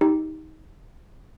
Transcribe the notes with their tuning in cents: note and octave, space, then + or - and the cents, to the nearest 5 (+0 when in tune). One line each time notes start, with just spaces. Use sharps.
D#4 +20 G4 +0